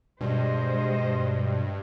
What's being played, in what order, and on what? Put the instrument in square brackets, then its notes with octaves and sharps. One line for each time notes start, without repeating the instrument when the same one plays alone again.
[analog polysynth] G2 [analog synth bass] B2 [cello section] G#3 C5 D#5